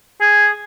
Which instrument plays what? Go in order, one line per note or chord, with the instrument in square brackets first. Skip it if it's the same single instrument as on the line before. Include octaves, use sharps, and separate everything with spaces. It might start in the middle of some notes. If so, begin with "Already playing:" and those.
[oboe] G#4